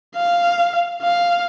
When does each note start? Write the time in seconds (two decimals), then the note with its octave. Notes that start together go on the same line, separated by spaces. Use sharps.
0.16 F5
1.03 F5